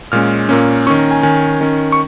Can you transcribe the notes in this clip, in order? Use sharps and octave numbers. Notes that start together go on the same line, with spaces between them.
A#2 G#3 C#4 F6
A#2 A#3 C#4
D#3 C#4 C#6
A#5
G#5
D#3 C#4 G#5
D#3 C#4
C#6